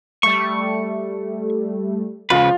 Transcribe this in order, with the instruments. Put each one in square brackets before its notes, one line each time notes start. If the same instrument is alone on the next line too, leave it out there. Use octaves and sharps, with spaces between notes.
[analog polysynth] G3 A3 [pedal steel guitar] C#6
[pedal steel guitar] C#3 B4 [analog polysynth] F3 G#3 [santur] F4